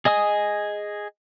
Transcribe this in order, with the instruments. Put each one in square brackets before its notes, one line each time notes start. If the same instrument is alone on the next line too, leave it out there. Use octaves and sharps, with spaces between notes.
[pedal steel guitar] G#4 D#5 G#5 D#6